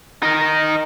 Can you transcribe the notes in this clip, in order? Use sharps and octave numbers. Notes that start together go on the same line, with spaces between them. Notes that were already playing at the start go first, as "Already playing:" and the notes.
D#4 A#4